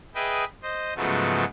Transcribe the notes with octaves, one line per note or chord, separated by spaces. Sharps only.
G#4 B4 D#5 E5 G5
C5 D#5
G#2 C#3 F3 F#3 A3 B3